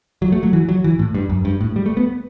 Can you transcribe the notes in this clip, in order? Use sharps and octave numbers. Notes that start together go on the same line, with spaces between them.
F#3
A3
F#3
E3
F#3
E3
A2
G2
F#2
G2
A2
G3
A3
B3